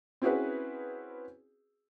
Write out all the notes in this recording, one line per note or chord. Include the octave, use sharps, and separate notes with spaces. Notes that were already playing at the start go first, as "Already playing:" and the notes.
C4 C#4 E4 F#4 G#4 B4